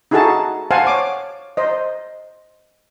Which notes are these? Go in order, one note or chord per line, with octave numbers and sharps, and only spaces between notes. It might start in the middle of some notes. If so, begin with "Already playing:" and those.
D#4 E4 F#4 G#4 A4 A5
C5 F5 F#5 G#5 A5
C#5 D6
C5 D#5